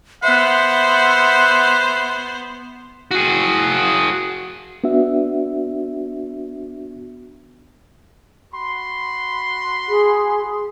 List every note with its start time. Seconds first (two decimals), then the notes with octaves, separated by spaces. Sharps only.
0.23 B3 C5 E5 F#5
3.11 F#4 G#4
4.84 B3 D4 F#4 E5
8.54 F#4 B5 C6
9.88 G#4